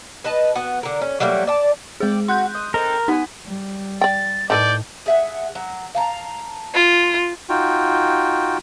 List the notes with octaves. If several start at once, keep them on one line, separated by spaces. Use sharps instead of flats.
B4 D#5 A5
B3 F#4
D3 A#4
C#4
F#3 G3 A3 A#3
D5 A5
G#3 G#4 D5 G5
F#4 C6 F#6 G6
D#5
C4 D#4 A4 A#4
B3 D#4 G#5
G3
D5 G5 A6
A2 D#3 A4 B4 D5 G6
G#4 E5 F#5
F#3
F5 A5 A#5
F4
D#4 F4 F#4 G5